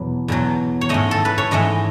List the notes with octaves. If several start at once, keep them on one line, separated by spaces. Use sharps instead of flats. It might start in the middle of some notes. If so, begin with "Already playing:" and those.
Already playing: E2 B2 F#3
E2 B2 F#3
C#5
G#2 E3 A3 D#5
A4
B4
C#5
G#2 E3 A3 D#5